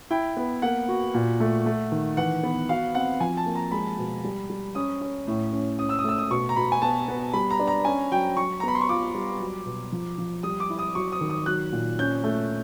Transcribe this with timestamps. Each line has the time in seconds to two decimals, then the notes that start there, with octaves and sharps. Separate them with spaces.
0.10 E4 G5
0.37 B3
0.62 A#3 F#5
0.88 F#4
1.14 A#2
1.40 A3
1.66 A3
1.92 D#3
2.17 E3 F#5
2.43 B3
2.69 F#4 F5
2.95 C4 F#5
3.20 F3 G#5
3.37 A5
3.46 A#3
3.55 A#5
3.72 G#3 B5
3.98 B2
4.24 G3
4.50 G3
4.75 C#4 D#6
5.01 C#4
5.27 A2
5.52 C#4
5.79 C#4 D#6
5.89 E6
5.99 D#6
6.04 A3 E6
6.18 D#6
6.31 B2 C#6
6.49 A#5
6.56 B2 B5
6.72 G#5
6.82 B3 A5
7.08 B3
7.33 G3 B5
7.51 A#5
7.59 D4
7.68 A#5
7.85 C#4 G#5
8.12 F#3 G5
8.37 F#3 C#6
8.60 A#5
8.63 B3 B5
8.75 C6
8.81 C#6
8.89 F4 D6
9.15 G3
9.40 F#3
9.65 B2
9.92 F3
10.18 F3
10.43 G3 D#6
10.60 D6
10.70 E4
10.79 D#6
10.95 F#3 C#6
11.12 D#6
11.21 D#3
11.30 D#6
11.46 F#3 F#6
11.72 A#2
11.99 C#4 G6
12.24 A3